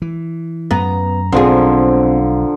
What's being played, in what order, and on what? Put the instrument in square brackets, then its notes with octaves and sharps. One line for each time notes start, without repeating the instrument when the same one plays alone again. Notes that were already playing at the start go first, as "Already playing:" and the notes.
[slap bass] E3
[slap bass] F#2 [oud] B3 [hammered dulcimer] A#5
[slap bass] B1 [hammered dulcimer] D3 F3 [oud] C4 G#4